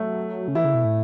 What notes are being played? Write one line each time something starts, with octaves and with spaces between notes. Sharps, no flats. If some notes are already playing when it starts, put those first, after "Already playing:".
Already playing: F#3 A3
C#3
E3 E4
C#3
B2
A2